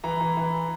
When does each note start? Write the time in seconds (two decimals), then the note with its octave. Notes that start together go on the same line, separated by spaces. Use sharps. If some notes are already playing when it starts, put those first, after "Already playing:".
0.04 E3 A#5
0.21 E3
0.37 E3